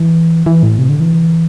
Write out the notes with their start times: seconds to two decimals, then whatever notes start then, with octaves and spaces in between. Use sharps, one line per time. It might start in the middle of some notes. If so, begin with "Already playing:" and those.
Already playing: E3
0.46 E3
0.63 A2
0.78 C3
0.89 D3
1.00 E3